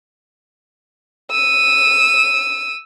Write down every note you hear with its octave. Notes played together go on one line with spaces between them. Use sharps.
E6 D#7